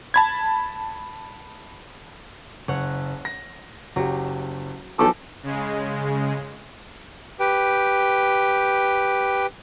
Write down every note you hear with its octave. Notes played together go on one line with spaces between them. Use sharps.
A5 B5 G#6
F#1 C#5 F#5
A#6
F#1 F#3 G4
B1 E3 F3 A4 D6
C#3 G#3
G4 B4 G5